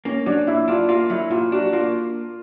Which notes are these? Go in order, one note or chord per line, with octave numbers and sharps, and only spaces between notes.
A#3 C#4
F#3 D4
A#2 E4
D4 F4
A#3 F4
F#3 E4
A#2 F4
D4 F#4
F#4
A#3 F4